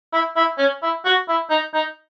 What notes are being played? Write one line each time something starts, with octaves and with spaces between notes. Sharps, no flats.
E4
E4
C#4
E4
F#4
E4
D#4
D#4